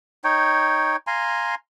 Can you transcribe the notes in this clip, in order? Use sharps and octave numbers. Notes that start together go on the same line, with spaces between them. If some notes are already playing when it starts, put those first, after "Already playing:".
D#4 C#5 G5
F5 G#5 A#5 C6